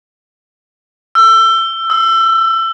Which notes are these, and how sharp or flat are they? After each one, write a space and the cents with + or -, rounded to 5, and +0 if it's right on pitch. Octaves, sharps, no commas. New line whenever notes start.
E6 +25
E6 -20